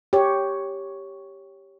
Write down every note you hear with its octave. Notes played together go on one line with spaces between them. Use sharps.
G4 C#5